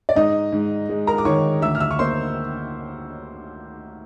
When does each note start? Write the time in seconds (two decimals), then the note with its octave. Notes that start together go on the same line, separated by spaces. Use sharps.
0.09 D5
0.16 G#2 D#4 D#5
0.52 G#2
0.89 G#3
1.07 A#4 A#5
1.18 D6
1.25 D#3 C#5 C#6
1.62 D2 E5 E6
1.75 F6
1.80 E5 E6
1.91 C#6
1.99 A#3 C5 C6